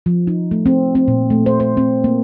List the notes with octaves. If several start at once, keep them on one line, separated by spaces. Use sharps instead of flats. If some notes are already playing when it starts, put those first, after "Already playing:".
F3
D#4
A3
C4
C4
A#2
A3
C5
C5
C4
A#3